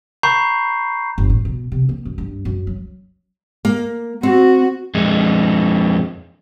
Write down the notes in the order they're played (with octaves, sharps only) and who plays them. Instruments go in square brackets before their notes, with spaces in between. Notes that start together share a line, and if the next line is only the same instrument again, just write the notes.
[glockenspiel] A#5 B5 C#6 G6 C7
[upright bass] G1
A2
B2
C3
A#3
F#2
G2
F#2
F#3
[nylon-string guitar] A#3
[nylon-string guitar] C4 [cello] F#4
[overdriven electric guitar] F2 G#3